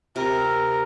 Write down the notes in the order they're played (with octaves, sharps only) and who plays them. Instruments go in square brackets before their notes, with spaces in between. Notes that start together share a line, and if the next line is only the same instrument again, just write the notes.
[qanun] C3 [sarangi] A#4